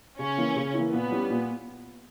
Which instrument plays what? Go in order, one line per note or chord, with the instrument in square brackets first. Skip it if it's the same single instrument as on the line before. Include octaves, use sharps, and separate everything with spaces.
[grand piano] C#3 [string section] C#4
[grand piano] E3 A#3 E4
C#3
E3 A#3 E4
[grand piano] A#2 [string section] B3
[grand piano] G3 C#4 E4 G4
A#2